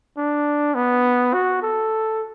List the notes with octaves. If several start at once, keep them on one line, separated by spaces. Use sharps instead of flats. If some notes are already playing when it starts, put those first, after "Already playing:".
D4
B3
F#4
A4